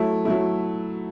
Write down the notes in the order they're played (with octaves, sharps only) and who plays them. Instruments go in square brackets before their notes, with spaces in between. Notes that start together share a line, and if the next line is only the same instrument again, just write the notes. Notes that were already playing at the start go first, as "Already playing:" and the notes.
Already playing: [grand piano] F#3 A3 E4
F#3 A3 E4